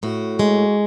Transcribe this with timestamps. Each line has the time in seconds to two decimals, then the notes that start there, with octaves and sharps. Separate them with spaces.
0.03 A2 F#4
0.39 G#3